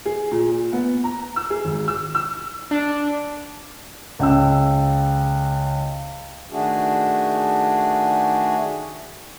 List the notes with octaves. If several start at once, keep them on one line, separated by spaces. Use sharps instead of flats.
G#4
A#2
B3
A#5
E6
G#4
G#1
E6
E6
D4
C#2 G5 E6
D#3 A3 D4 F#4 G#4